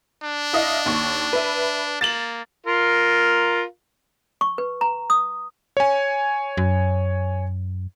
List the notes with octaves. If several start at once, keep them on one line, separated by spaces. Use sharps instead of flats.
D4
E4 D#5 F5
D#2 C#6
B4 E5
A#3 A6 E7 F#7
F4 A#4
C#6
B4
A#5
D#6
C#5 G#5
F#2